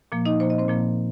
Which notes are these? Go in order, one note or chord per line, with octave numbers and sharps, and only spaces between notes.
A#2 F3 A#3
D#4 D#5
A#2 F3 A#3 C5
D#5
C4 C5
A#2 F3 A#3